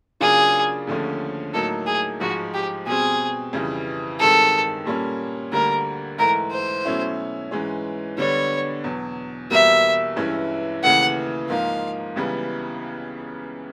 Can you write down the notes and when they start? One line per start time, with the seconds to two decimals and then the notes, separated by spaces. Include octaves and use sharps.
0.20 C#3 F#3 A#3 D4 F4 G#4
0.87 D#2 D3 F3 A3 C#4
1.54 A2 F#3 A#3 D#4 A4
1.87 G#4
2.20 G#2 F3 G#3 F#4
2.54 G4
2.87 B2 G3 C4 G#4
3.53 F2 C#3 E3 G3
4.19 G2 D#3 G#3 C4 A4
4.86 A#2 G3 A#3 C#4
5.52 D2 D3 G3 A#3 A#4
6.18 G#2 E3 A3 A#4
6.51 C5
6.85 B2 F#3 A3 C#4 E4
7.51 G#2 E3 G#3 C#4
8.18 D3 G3 B3 D4 C#5
8.84 E2 B2 F#3
9.50 E2 B2 G3 A#3 E5
10.16 G2 E3 G#3 C#4 E4
10.83 D#2 C#3 E3 A3 F#5
11.49 G#2 F3 A#3 D#4 F5
12.16 C#2 C#3 E3 G3 B3